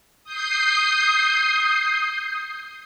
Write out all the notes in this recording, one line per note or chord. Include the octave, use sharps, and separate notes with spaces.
D#6 G6 C7